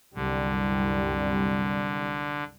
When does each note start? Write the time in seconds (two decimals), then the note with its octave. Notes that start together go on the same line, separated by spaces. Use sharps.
0.15 C2 F#2 D3 G3